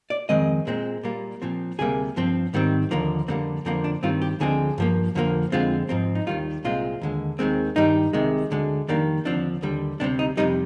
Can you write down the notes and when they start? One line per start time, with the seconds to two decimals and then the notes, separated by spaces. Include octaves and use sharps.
0.10 D5
0.29 F2 D#3 G#3 C4 D#5
0.67 A#2 G#3 C4
1.04 A#2 G3 A#3
1.42 A#2 F3 C4
1.78 D2 C3 G3 A#3 G#4
2.16 G2 F3 C4
2.54 G#2 D#3 G3 C4
2.91 D#2 D3 F3 A#3
3.28 F2 D3 G3 A#3 C4
3.65 F2 D3 F3 A#3 C4
3.84 D4
4.03 G2 D#3 G3 C4 F4
4.22 G4
4.40 D2 D3 F3 G#3 C4 G#4
4.78 G2 F3 A#3
5.15 F2 D3 F3 A#3
5.52 F2 D3 G#3 C4 F4
5.89 G#2 F3 C4
6.15 D#4
6.27 D#2 D#3 G3 F4
6.64 C2 A#2 G#3 C4 F4
7.02 D#2 D3 G#3
7.39 D#2 D#3 G#3 C4
7.76 G2 D#3 G3 D#4
8.13 C2 C3 D#3 G#3
8.51 D2 D3 G#3
8.88 F2 D#3 G3 A#3 D4
9.25 D#2 D3 F3 C4 D4
9.62 D#2 D3 G3
10.00 D2 C3 G3 C4 D4
10.19 D#4
10.37 F2 C3 G3 D#4